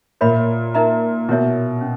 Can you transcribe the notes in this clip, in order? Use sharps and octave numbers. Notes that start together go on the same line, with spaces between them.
A#2 A#4 C#5 E5 B5
D#4 A#4 E5 A#5
B2 E4 A#4 C#5 E5
C#4